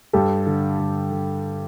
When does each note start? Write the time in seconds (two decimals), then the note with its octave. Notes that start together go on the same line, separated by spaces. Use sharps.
0.13 G2 G4 A4
0.47 D3
0.79 G2
1.12 D3